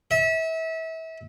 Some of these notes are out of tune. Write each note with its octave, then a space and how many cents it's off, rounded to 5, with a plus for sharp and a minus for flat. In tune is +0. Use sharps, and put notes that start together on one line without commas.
E5 -30